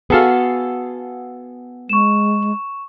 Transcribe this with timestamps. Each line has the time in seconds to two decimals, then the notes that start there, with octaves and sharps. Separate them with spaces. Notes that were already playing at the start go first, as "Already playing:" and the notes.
0.10 B3 F#4 G#4 A4 F5 F#5
1.89 G#3 C#6 E7